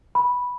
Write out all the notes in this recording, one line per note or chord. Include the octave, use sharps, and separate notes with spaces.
B5